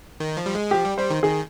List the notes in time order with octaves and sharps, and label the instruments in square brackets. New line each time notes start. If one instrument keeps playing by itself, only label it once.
[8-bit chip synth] D#3
F3
G3
G#3
[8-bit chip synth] F3 [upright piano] G4
[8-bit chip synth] G3
[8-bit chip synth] G3 [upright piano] C5
[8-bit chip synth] D#3
[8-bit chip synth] D#3 [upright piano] G#4